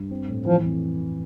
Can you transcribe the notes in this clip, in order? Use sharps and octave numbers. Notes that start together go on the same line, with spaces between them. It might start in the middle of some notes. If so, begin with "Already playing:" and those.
Already playing: G2
C4
A2
E3 F3
F2